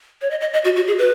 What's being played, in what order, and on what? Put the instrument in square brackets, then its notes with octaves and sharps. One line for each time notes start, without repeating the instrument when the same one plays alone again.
[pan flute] C#5
D#5
D#5
D#5
F#4
F#4
G#4
B4